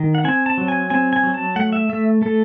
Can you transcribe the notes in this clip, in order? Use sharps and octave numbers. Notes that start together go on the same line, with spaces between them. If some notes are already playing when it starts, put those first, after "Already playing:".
Already playing: D#3
F#5
C4 G#5
A5
F#3
G#5
C4 G#5
G#5
F#3
A5
A3 F#5
E5
A3 E5
A3 A4